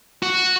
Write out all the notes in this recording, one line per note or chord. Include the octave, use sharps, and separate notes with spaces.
F#4